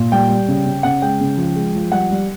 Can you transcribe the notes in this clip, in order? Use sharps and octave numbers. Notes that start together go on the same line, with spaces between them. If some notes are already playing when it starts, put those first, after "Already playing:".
Already playing: A#2
G3 G5
G3
C#3
C#3
C#3 F#5
G#3 G5
C#3
F3
G#3
F3
G3 F#5
G3